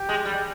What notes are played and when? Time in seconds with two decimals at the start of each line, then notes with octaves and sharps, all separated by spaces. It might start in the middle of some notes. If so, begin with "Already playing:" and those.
Already playing: G4
0.09 G#3
0.25 G3